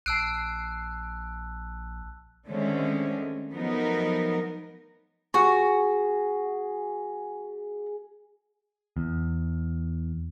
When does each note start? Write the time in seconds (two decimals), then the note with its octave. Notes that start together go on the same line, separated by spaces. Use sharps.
0.06 A#1 A5 E6 F#6 C7 D7
2.48 D3 D#3 G#3 A3 C4 C#4
3.52 F3 F#3 A3 B3 D#4 A#4
5.34 F#4 G#4
8.97 E2